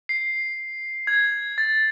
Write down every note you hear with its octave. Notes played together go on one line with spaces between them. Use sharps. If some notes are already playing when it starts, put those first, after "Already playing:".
C7
G#6
A6